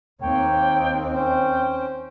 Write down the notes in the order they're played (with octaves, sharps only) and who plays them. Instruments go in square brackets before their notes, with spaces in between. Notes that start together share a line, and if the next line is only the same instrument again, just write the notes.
[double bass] D#2 C4 [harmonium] A#3 C#5 [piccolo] G5
[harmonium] C#4 C5 [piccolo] G5